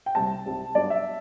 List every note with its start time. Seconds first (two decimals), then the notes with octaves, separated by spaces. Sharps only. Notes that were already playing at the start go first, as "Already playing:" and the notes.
0.06 G5
0.15 C2 C3 G3 C4 A5
0.45 C2 C3 G3 C4
0.75 G2 F#3 B3 D4 D5
0.90 E5